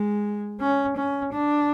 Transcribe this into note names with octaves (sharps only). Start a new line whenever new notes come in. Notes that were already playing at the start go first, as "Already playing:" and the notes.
Already playing: G#3
C#4
C#4
D4